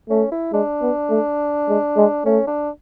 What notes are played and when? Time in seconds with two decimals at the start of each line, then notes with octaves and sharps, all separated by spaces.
0.10 A3 C#4
0.32 E4
0.53 G#3 D4
0.82 B3
1.10 A3
1.69 G#3
1.97 G#3
2.25 A3 C#4
2.47 D4